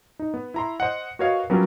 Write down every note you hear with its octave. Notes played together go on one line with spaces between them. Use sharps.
D#4
B3
E4 A#5 C6
C5 D#5 F#5
F#4 A#4 B4 C#5 D#5 F5
F#3 G3 B3 C#4 F4 A#4